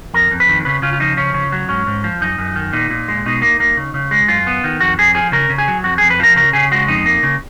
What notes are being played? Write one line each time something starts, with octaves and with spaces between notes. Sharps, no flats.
F2 A#4
F2
B4
D#3
C#3 B4
C#3 F4
F4
F3 D#4
C#3 C#4
C#3
F#3
G#2 C#4
G#2
F3
F#2 D#4
F#2
D#3
A#2 D#4
A#2
G#3
B2 D#4
A#3
A#3
C#3
C#3
G#3
F#2 F4
B3
D#3
F2 F#4
F2 G#4
F3 G#4
C#3 A#4
C#3
G#4
F#3
F2 F#4
F2 G#4
B4
F3 A#4
C#3 A#4
C#3 G#4
G#3 F#4
F2 D#4
A#3
C#3